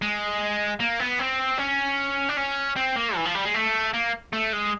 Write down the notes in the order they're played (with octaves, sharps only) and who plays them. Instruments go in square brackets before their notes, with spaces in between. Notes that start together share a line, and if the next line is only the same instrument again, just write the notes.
[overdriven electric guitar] G#3
A#3
B3
C4
C#4
D4
C#4
C4
A#3
E3
F3
G3
G#3
A3
A#3
A3
G#3